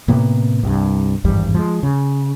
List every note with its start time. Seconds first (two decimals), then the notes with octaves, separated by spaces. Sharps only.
0.08 A2 C3 A#3 B3
0.63 C2 G2
1.24 G#1 E2 G2 G3
1.54 F3 G3 G#3
1.83 C#3